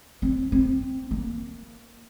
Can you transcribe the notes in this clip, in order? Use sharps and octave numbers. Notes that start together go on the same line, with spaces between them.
C4
C4
A#3